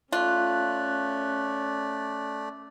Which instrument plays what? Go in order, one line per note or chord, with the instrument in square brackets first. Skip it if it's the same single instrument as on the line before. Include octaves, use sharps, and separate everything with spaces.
[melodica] A3 D5 [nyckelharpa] C#4 [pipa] F4 [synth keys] F#6